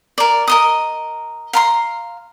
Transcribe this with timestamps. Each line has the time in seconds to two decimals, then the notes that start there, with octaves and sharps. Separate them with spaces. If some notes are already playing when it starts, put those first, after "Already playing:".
0.18 A#4 D5
0.48 A#4 D#5 D#6
1.53 F5 A#5 C6